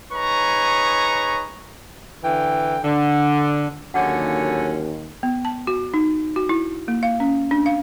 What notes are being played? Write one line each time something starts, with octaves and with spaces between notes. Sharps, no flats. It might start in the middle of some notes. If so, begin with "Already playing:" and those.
D#4 G#4 B4 C#5 A#5 C#6
D3 E3 G5
D3
D#2 D3 F#3 C#4 F#5
B3
A5
F#4
D#4
F#4
E4
A#3
F5
C#4
D4
F5